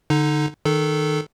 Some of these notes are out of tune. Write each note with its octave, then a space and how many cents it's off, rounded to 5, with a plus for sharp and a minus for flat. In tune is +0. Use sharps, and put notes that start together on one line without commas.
D3 +0 D#4 -10
D#3 +0 D#4 -30 A4 -10